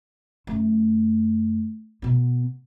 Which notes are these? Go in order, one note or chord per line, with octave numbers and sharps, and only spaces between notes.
F#2 A3
B2 B3